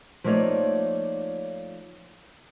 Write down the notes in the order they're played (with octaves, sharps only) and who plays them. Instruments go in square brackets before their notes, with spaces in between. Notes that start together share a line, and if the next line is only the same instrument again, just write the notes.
[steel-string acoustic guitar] F3 A3 A#3 D#4 C#5 D5